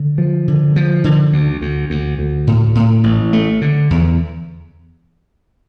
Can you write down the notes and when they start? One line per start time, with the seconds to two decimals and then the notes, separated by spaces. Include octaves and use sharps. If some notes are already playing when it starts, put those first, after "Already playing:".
Already playing: D3
0.18 F3
0.48 D3
0.76 F3
1.04 D3
1.32 D2
1.61 D2
1.90 D2
2.19 D2
2.47 A2
2.75 A2
3.04 A1
3.33 A3
3.62 D3
3.90 E2